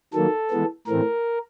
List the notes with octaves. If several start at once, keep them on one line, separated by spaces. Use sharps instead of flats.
D#3 F#3 A#3 A4
E3 G#3 B3
A2 E3 A3 C4 A#4